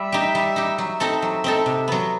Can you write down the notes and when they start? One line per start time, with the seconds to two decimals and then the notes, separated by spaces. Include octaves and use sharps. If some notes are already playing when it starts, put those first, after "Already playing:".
Already playing: G3 E5
0.12 D#4 G4
0.35 G3
0.56 D#4 G4
0.78 F#3 E5
1.00 C4 D#4 A4
1.22 F#3
1.44 C4 D#4 A4
1.66 C3
1.88 F#3 B3